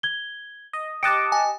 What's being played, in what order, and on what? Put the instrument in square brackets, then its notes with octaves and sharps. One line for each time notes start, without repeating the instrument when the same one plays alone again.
[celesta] G#6 G7
[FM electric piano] D#5
[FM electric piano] G4 D#5 A5 [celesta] D6 F#6 C#7 [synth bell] D7
[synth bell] G#5